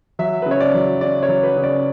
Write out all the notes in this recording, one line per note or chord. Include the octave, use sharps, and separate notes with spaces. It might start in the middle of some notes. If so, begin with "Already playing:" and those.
F#3 E5
C#3 B4
C#5
D5
F#3
C#3 D5
C#5
F#3
B4
C#3
D5